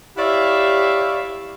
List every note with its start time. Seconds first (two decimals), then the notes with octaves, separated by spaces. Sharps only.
0.18 E4 G4 C#5 D5 E5 F5